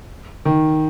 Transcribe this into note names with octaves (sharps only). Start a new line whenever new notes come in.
D#3